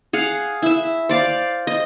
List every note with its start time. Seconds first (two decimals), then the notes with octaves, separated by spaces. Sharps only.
0.13 G#4 F5 F#5
0.62 E4 E5
1.09 C5 D5 F5
1.67 D#5